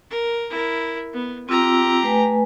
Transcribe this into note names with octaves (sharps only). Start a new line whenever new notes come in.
A#4
E4 A#4
B3
C4 F4 G4 A#5 E6
A3 B4 G#5